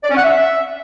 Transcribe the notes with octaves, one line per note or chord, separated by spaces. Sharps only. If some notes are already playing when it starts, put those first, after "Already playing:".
D5
C#4
F#5
E5